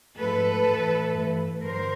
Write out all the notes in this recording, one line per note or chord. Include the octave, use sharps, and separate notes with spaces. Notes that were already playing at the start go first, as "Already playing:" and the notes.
G#2 F3 A3 A4 B4
A2 E3 A3
G2 E3 A3
G2 D3 F#3 A#4 C5